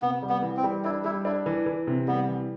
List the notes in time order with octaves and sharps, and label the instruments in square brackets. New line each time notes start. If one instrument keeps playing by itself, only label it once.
[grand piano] C3 [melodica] B3
[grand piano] G3
[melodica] B3
[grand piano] E3
[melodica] C4
[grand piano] G3
[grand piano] D4 [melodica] E4
[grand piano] G3 [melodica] E4
[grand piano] D4 [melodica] E4
[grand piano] E3
E3
C3
[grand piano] G3 [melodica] B3
[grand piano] E3